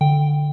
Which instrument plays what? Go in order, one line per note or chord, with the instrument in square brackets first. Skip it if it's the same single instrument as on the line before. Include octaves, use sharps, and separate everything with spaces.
[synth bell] D3 G5